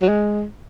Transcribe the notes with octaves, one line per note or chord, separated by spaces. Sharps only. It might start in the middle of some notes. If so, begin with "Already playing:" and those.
F#3
G#3